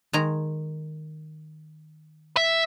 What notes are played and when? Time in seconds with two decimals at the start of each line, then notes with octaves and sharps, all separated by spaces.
0.13 D#3 G#3 A#5
2.37 E5